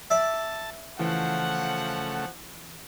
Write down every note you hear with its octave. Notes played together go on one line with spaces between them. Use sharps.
D5 E5 A5
C#3 E3 F3 A3 F#5